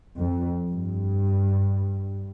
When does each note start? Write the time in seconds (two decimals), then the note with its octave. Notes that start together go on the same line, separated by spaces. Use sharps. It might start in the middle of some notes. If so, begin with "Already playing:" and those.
0.16 F2
0.70 G2